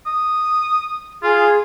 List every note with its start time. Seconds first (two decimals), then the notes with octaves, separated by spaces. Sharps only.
0.07 D#6
1.23 F4 G#4